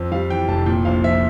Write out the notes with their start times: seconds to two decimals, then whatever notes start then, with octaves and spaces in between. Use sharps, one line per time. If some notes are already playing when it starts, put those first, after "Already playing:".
Already playing: F2
0.12 G3 F5
0.30 E3 G5
0.48 F1 A5
0.66 A#2 G5
0.85 A#1 F5
1.04 F3 E5